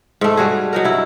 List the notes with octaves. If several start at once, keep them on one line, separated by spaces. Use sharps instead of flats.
G#2 A3
G3 F#4 G#4
F#3 D#4 A#4
G2 E4